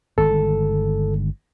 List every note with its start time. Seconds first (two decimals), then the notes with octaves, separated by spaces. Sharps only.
0.18 G1 D#3 G#3 A4